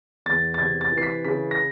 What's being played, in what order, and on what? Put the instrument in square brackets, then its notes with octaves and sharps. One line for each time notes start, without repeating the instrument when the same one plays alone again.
[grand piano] E2 A6
A6
C3 G#6
A6
E3
C7
B6
C#3 B6
A#6